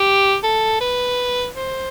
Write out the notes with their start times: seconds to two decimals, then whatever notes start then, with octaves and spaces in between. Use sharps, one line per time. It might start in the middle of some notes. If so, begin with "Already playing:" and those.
Already playing: G4
0.43 A4
0.81 B4
1.55 C5